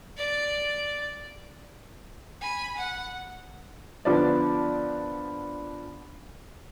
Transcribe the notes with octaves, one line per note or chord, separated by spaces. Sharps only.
D5
G#5 B5
F#5
D3 F3 B3 D4 D5